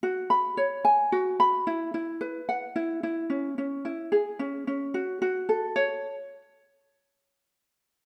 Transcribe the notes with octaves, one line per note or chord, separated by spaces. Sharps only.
F#4
B5
C#5
G#5
F#4
B5
E4
E4
B4
F#5
E4
E4
C#4
C#4
E4
G#4
C#4
C#4
F#4
F#4
A4
C#5